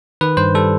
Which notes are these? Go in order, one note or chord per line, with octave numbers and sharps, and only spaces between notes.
D#3 B4
G2 C5
G3 A4